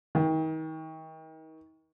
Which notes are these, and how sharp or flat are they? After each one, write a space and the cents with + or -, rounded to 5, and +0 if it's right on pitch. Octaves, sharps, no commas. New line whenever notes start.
D#3 +35